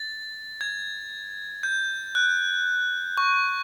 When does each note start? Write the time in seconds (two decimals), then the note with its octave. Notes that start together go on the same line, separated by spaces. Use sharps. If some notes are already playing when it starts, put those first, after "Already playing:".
Already playing: A6
0.61 G#6
1.63 G6
2.15 F#6
3.17 C#6